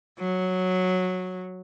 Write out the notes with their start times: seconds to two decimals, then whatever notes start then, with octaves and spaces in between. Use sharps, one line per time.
0.19 F#3